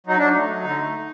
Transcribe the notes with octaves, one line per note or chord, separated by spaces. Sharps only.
F#3 D#4
F#3 D4
D#4
A3
F#3
D3
A3